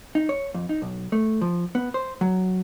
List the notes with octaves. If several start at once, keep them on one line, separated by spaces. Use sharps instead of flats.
D#4
C#5
F2
D#4
B1
A3
F3
B3
C5
F#3